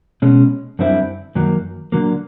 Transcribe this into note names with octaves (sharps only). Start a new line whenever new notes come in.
B2 G#3 C#4
F#2 D3 G3 C4 E4
F#2 D#3 F#3 A#3
D3 F#3 A#3